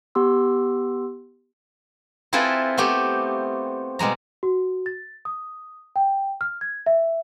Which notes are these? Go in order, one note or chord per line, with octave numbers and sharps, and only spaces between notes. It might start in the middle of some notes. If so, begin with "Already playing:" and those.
B3 G4 C6 E6
C4 E4 F4 G#4 A4 B4
A3 B3 C4 G4
B2 G3 G#3 A#5
F#4
A6
D#6
G5
F6
G#6
E5